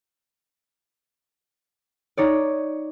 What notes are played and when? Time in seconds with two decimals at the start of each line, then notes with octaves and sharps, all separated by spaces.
2.17 D#4 C#5 D5